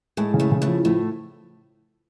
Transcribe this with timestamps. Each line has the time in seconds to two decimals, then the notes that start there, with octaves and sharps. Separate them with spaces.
0.17 A2 G#3 A3
0.34 C#3
0.40 A2 A3
0.52 C#3
0.62 A2 A3
0.68 F3
0.85 A2 F3 A3